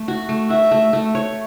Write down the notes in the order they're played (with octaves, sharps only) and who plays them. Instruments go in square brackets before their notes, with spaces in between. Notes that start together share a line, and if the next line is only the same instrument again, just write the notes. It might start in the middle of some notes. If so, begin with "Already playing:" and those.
Already playing: [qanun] A3
F#4
A3
[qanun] F#4 [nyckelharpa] E5
[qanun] A3
A3
C#5